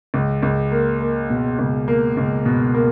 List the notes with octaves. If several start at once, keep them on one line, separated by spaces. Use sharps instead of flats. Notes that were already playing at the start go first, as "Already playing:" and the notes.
C#2
C#2
A#3
A#3
B2
C#2
A#3
C#2
B2
A#3